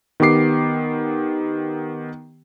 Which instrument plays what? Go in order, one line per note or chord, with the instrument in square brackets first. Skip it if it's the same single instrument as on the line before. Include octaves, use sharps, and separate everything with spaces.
[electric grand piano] D#3 B3 G4 D6 C7